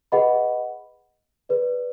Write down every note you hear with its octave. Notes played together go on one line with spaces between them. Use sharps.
G#4 B4 D#5 F#5 B5
G#4 B4 D5